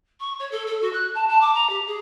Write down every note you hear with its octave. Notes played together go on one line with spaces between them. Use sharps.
C#6
C#5
A4
A4
F#4
F#6
A5
A5
D6
A#5
G4
G#4